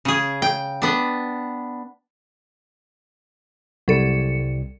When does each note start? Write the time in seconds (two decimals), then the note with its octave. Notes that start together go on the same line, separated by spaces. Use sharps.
0.05 C#3 G#4
0.42 G5
0.82 B3 D4
3.88 C2 F#3 G3 A4 C#7